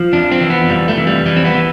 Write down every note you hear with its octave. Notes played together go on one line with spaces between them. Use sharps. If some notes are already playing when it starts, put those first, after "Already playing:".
Already playing: F3
F2 D4
C4
E3
B3
F2 G3
A3
E3
G3
E3 G3
C4
B3
E3